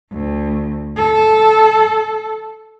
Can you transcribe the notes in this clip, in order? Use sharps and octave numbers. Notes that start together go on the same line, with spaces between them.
D2
A4